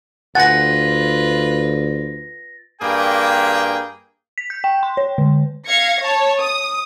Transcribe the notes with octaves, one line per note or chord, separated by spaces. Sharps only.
D2 F4 B4 F#5 G#5 A6 A#6
G2 A#3 G#4 G5
B6
G6
G5
C6
C#5
D3
F5 G#6 A#6 C#7
C#5 A5
D#6